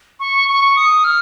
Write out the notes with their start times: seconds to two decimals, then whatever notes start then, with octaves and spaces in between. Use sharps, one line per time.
0.20 C#6
0.48 C#6
0.76 D#6
1.04 F6